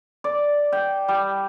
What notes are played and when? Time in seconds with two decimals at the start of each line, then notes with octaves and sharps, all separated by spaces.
0.24 D5
0.72 G5
1.08 G3